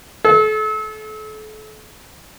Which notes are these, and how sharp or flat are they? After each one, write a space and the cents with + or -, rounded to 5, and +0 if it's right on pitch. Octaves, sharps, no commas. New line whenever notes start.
A4 -35